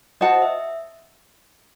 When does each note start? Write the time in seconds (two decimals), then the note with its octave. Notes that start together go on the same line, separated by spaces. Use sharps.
0.21 F#4 C5 D#5 F#5 A5
0.42 E5